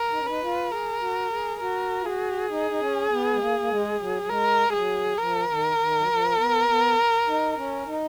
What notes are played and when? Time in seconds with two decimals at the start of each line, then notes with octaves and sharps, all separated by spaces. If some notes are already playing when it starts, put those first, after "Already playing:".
Already playing: A#4
0.11 D#4
0.19 C#4
0.27 D#4 B4
0.42 F4
0.71 G#4 A#4
1.01 F#4
1.31 G#4
1.60 F#4 A#4
2.02 F4
2.06 F#4 G#4
2.50 D#4
2.70 D#4
2.80 C#4
3.10 B3
3.33 G#3
3.40 A#3
3.59 A#3
3.69 G#3
3.99 F#3
4.22 F#3
4.29 G#3 A#4
4.68 G#3
4.73 F#3 G#4
5.18 F3 A#4
5.48 D#3
5.78 D#3
5.99 F#3
6.08 F3
6.37 B3
6.68 B3
7.27 D#4
7.57 C#4
7.86 D#4